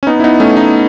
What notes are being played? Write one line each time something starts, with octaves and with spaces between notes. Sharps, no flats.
C#4
B3 D#4
E4
B3 D#4
A3 C#4
B3 D#4